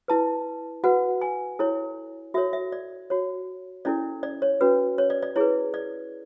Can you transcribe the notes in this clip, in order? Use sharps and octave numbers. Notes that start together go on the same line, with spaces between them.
E4 B4 A5
F#4 B4 F#5
G#5
E4 A4 C#5
F#4 A4 C#5 E5
E5
D5
F#4 C#5
C#4 E4 A4 D5
D5
C#5
C#4 F#4 B4
C#5
D5
D5
E4 G#4 B4 C#5
D5